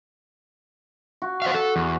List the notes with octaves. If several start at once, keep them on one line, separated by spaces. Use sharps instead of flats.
F#4
C5 D#5 F5
A4
E2